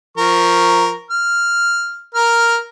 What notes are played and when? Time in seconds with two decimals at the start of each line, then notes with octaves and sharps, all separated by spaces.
0.18 F3 A#4 C#6
1.11 F6
2.15 A#4 F6